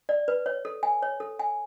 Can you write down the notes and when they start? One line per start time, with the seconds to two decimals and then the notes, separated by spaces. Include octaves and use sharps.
0.09 D5
0.28 B4
0.46 C#5
0.65 A4
0.83 G#5
1.02 C#5
1.20 A4
1.39 G#5